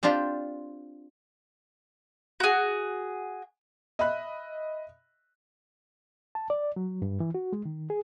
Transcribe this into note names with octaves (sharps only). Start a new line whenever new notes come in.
C4 D4 F4 G4 C5
F#4 G#4
D#5 E5 B5 F#6
A5
D5
F#3
G2
E3
F#4
G#3
D#3
G#4